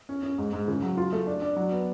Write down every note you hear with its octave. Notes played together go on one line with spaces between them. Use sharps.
C#4
C#4
G#2
G#2
C#3
F#3
F4
A3
D4
D4
F#3
B3